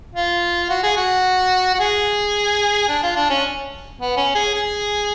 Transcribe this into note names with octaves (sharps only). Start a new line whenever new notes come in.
F4
F#4
G#4
F#4
F#4
G#4
D4
F4
D4
C#4
B3
C#4
G#4
G#4